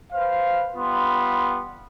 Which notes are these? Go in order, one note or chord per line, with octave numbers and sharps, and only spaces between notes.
B4 C5 F5
G3 B3 F4 B5 C6